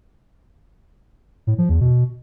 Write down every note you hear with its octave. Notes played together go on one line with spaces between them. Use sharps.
A2
F3
E2
B2